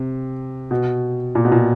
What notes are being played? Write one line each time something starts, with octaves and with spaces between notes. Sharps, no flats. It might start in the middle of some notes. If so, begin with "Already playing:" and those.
Already playing: C3
B2
A#2
B2
A#2